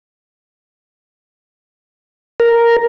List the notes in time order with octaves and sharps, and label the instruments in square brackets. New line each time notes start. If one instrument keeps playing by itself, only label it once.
[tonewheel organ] A#4